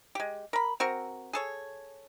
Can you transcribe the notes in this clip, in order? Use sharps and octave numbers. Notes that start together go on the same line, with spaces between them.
G#3 G4
A#4 B5
C4 F#4 A#4
G#4 A4 C#5